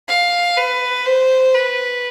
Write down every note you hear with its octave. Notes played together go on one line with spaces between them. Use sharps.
F5
B4
C5
B4